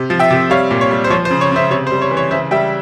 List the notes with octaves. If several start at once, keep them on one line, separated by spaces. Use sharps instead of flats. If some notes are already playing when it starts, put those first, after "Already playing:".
Already playing: C3
F3
E5 G5
C3
G3 C#5 F5
A#2
C#5
G3
C5
F3 C#5
C5
C#3
C#5
C#3 C5 E5
C3 C#5
C5
G3
C#5
E3
C#5
C#3 C5 E5
G3 E5 G5